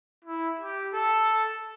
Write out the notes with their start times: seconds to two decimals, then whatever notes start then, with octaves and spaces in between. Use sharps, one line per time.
0.25 E4
0.60 G4
0.94 A4